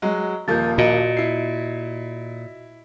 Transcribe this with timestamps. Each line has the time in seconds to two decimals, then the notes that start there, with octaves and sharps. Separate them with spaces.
0.02 F#3 G#3
0.48 D#1 F3 A#3 G6 A6
0.78 A#2 F#4 D#5
1.17 E4 C7